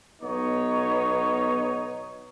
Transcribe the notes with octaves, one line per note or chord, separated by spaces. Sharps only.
B1 B3 D#4 C#5